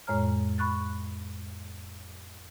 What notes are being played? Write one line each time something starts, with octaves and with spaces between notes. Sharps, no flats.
F2 A2 G#3 C#5 A#5 F6
B5 C#6 F#6 A6